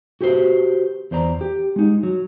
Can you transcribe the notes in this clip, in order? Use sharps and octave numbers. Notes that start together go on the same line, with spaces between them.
F#4 G4 B4 C5
E2 C5 D5 A#5
G4
G#3 D#4
F#3